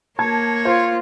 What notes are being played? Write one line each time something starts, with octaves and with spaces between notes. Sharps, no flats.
A#3 C#5 A5 G#6
F4 C5